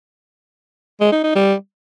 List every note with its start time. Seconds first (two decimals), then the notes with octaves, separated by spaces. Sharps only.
1.01 G#3
1.12 D#4
1.24 D#4
1.35 G3